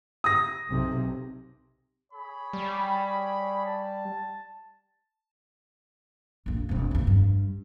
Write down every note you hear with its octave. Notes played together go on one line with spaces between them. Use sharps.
D#6 A#6
B1 C3
G#4 C#5 B5
G3
A5
A#1 F2
E1 C4
B1 F2
G2